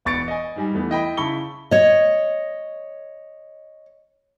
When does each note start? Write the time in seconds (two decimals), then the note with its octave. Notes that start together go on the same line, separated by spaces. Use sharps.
0.05 E1 B3 C#6 A6 C#7 D7
0.28 D#5 G#5
0.56 G#2 G3 G#5
0.74 E2 A3 B3
0.89 E4 D#5 G5 B5
1.17 C#3 E4 A5 B5 C#6 G7
1.71 C#5 D#5